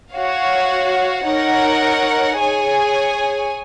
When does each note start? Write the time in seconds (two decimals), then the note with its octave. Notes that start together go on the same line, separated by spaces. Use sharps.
0.12 F#4 C#5 F5
1.25 D#4 A#4 C#5 F#5
2.38 G#4 C#5 G#5